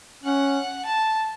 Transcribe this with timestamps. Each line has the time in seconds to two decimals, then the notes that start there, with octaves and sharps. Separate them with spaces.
0.23 C#4 F#5
0.85 A5